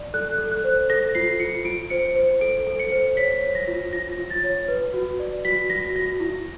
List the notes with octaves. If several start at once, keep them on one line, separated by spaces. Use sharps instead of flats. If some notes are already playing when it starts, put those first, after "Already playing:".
Already playing: D5
A4 F#6
A4
F#6
C5
A4 A#6
F4 C7
F4 C#7
F4 D7
C5 C#7
C5
A4 D7
A4
C#7
C5
C#5 B6
C#5
A#6
F4
F4 A#6
F4
A6
C#5
B4
F#4
D5
F#4 B6
F#4 A#6
F#4 A#6
E4